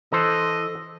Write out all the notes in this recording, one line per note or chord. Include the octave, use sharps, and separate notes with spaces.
E3 A4 C5 D#5